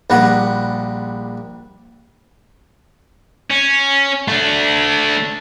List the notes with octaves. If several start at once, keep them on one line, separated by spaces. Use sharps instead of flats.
A#1 G3 F#5 A#5
C#4
A3 D4